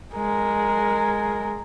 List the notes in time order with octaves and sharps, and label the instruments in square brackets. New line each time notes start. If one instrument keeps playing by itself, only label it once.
[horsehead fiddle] G#3 A#4